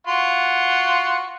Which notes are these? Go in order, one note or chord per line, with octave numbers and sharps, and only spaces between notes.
F4 F#4 C6